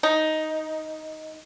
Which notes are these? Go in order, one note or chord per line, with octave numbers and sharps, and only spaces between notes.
D#4